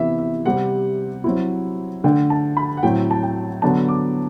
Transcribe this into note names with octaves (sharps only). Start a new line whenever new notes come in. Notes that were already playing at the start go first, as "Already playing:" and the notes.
Already playing: C3 E3 B3 E4 E5
E5
C3 G3 C4 F#5
F#3 C4 E4
D3 A3 D4 G5
A5
B5
F#5
A2 F#3 C4 G5
A5
G5
D3 F#3 B3 D4 A5
D6